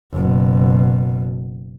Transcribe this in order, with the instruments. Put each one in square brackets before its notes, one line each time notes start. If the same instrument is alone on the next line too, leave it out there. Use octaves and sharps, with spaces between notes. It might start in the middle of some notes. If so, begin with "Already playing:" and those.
[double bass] F#1 B2